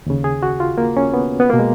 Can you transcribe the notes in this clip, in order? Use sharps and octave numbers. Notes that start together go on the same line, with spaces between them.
D#2 C#3
G#4
F#4
F4
A#3
C#4
B3
B3
B2 A#3
G#3